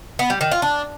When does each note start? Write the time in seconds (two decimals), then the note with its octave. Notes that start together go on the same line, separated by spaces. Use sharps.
0.19 B3
0.30 G3
0.41 D#3
0.51 F4
0.62 D4